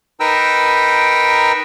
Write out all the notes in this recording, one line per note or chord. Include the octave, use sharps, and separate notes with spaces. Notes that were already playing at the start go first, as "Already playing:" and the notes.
D#4 A#4 B4 G5 A#5 E6